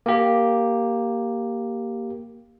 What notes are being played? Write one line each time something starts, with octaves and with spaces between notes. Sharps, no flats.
A#3 G4